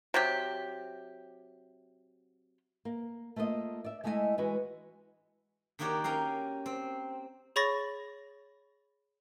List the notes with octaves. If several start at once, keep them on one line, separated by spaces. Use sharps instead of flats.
C3 F#3 G4
A#3
A3 A#3 F4 C5 D#5
D5 E5
G#3 A3 E4 D#5 E5 G#5
E3 G#3 F#4 B4
D#3 A#3 F#4 G4 C#5 D5
C#4 A#4 F5 G5
C4
G#4 C#5 B5 C#6 A6 A#6